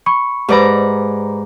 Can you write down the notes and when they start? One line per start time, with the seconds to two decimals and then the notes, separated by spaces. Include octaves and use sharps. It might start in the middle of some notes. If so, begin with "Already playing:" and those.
0.06 B5 C#6 C#7
0.49 G#2 G4 B4 D5 A#5 B5